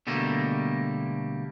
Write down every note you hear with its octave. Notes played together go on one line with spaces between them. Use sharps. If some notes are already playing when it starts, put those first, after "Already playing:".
B2 D3 G3 A3 A#3